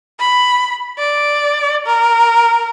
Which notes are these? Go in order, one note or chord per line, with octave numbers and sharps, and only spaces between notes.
B5
D5
A#4